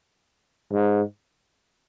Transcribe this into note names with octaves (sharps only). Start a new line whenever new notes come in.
G#2